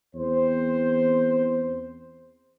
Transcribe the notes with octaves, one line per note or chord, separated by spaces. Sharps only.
E2 C4 C5